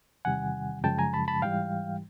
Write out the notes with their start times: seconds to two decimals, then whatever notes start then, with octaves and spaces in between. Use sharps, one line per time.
0.25 E2 C3 D#3 G3 F#5 G#5
0.84 F#2 C#3 F3 G#3 G5 A5
0.99 G#5 A#5
1.14 A5 B5
1.28 A5 B5
1.42 G#2 E3 G3 F5 G5